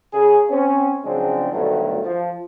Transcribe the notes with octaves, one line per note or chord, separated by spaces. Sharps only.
C#3 G#4
C4 C#4
C#3 F3 F#3 G#3 C4 D4
D2 G2 B2 D#3 F#3 A3
F3